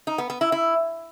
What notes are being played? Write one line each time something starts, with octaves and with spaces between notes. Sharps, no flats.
D#4
B3
B3
E4
E4